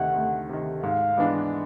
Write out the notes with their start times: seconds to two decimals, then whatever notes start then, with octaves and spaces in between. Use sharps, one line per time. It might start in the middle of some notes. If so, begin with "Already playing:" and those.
Already playing: D2 C3 D#3 F#5
0.15 D2
0.49 C3 D#3
0.83 G#2 F5
1.17 E3 G#3 B3 D4